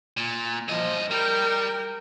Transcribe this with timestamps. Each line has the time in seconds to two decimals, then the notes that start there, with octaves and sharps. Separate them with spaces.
0.17 A#2
0.68 G2 F3 D#5
1.11 G3 A#4 G5